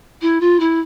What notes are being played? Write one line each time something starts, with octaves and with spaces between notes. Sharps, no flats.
E4
F4
E4